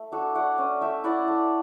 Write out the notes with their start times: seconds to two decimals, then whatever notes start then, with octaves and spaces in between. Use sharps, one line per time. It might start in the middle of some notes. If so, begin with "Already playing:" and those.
Already playing: A3
0.12 D4 F#4 A4
0.35 A3 D5 F#5
0.58 C#4
0.81 A3 E5 G5
1.04 E4 D5 F#5
1.28 A3